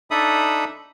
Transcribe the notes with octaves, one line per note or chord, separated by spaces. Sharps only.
D4 D#4 A4 E5 B5 D#6